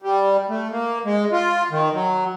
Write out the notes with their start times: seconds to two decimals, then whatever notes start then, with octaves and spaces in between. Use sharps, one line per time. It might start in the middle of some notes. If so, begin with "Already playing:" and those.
0.02 G3
0.49 A3
0.71 A#3
1.05 G#3
1.32 F4
1.71 D#3
1.94 F#3